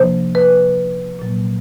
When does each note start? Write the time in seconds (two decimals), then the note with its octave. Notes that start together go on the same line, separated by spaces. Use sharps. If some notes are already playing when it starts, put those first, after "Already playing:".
Already playing: C3 F3 A#3 D4 C5
0.35 B4
1.19 A#2 F#3 A#3